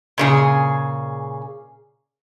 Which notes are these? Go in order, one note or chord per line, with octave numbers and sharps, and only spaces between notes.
A#2 C#3 G#4